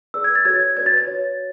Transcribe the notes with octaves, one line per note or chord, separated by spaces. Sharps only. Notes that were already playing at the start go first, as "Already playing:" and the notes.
G#4 B4 D5 E6
G#6
A6
F#4 A4 C#5 G#6
G#6
F#4 B4 D5 G#6
A6
A6
F#4 C#5